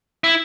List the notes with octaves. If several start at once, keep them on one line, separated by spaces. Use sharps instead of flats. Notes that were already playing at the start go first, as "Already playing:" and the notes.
E4